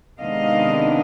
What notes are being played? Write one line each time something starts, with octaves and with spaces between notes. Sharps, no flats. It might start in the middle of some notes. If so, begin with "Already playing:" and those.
C3 D#3 G#3 B3 D4 D#5 F5